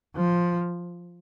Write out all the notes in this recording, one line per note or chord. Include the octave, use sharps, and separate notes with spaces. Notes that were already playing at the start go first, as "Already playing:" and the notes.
F3